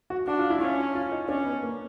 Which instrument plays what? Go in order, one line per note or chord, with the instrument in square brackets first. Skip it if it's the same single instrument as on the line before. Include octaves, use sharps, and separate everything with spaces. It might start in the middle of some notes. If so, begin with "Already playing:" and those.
[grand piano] F#4
[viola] D4 [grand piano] F#4
[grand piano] F4
E4
[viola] C#4 [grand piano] F4
[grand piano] F4
D#4
[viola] C#4 [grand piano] D4
[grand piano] B3
A#3